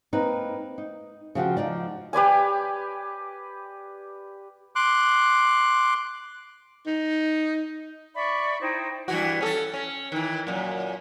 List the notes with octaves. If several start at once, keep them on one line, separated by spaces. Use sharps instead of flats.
A#3 C4 D#4 B4
D#4
C#3 F3 F#4 G4
F3 D#4 D5
G4 B4 D5 G#5
C6 D6 F#6
D#4
D5 E5 B5 C#6
D#4 E4 C5 G5
G2 E3 F#4
C#4 G#4 A4
C#4
D#3 E3
F#2 A#2